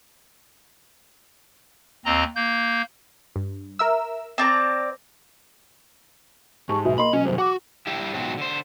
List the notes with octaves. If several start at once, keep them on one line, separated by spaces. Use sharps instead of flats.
D#2 C4 D#5 A#5
A#3 G6
G2
A#4 E5 E6
C4 D5 A5 A#5
G#2 G4 A5 C#6
B1 B2 E5
A#3 D#5 B5 C6
B2 F#3 C#4
C2 F#2 C5
F#4 F#5 D6
G3 D4 E4 G4
G#2 B2 F3 F#3 C4
D3 C5